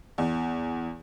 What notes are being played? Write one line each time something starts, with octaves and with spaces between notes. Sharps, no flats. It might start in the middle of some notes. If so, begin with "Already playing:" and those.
E2